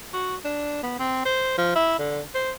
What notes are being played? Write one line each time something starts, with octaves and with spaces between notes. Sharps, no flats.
F#4
D4
B3
C4
C5
F3
E4
D3
C5